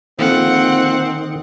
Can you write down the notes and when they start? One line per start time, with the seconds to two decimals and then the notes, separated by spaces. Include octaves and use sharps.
0.19 A#1 F2 D#3 C4 F4 F#5